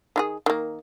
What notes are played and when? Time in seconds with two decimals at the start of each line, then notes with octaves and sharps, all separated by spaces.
0.16 D#3 F4 G#4
0.46 D#3 A#3